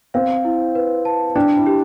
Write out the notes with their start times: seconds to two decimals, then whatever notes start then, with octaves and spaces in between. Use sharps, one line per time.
0.14 C4 F5
0.45 E4
0.75 B4
1.05 A5
1.36 D4 G5
1.57 E4
1.66 G4